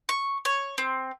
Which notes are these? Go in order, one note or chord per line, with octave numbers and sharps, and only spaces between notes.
C#6
C#5
C4